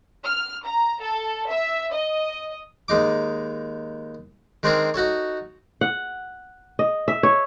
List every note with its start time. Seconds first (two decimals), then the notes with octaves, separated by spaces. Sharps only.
0.25 F6
0.65 A#5
1.02 A4
1.50 E5
1.93 D#5
2.88 D#2 G#3 D#4 D6
4.63 D#3 G#3 C4 D4 G#4 A#4
4.94 D#4 F#4 A4 C#5
5.81 F#5
6.79 D#5
7.08 E5
7.23 C#5